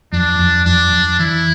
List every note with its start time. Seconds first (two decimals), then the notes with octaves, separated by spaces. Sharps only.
0.12 F2 D4
0.39 F2
0.66 F2 D4
0.93 F2
1.19 E3 E4